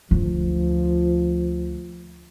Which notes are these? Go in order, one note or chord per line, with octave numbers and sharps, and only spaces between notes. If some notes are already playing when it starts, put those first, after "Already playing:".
D2 F3